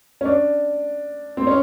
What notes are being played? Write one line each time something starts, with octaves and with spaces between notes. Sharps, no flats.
C#4
D4
C4
C#4